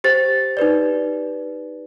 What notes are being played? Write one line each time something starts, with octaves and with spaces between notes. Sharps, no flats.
G4 C5 A6
D#4 G4 B4 D5